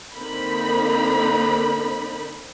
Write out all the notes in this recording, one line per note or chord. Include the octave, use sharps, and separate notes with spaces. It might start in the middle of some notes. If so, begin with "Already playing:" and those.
D3 A#3 C4 D#4 B5